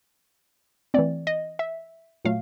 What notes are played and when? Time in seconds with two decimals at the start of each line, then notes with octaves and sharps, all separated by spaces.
0.94 E3 A3 C4 D5
1.27 D#5
1.59 E5
2.25 A#2 F#3 A3 F5